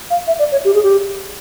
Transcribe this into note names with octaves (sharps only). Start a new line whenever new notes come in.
F5
E5
D5
C#5
G4
G#4
G4